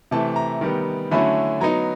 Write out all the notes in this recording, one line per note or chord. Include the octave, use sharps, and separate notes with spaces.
C3 E3 A3 A5
A#5
D#3 G3 B3
D3 F#3 A3 C#4 E4 B5
F#3 B3 D#4 A#5